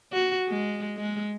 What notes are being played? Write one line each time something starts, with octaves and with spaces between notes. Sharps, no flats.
F#4
G#3
G#3